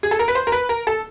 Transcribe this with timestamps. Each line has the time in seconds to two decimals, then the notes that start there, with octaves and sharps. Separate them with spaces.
0.03 G#4
0.11 A4
0.19 A#4
0.28 B4
0.35 C5
0.47 A#4
0.52 B4
0.69 A#4
0.87 A4